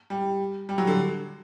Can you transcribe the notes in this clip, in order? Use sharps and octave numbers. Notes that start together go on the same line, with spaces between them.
G3
G3
F#3
D3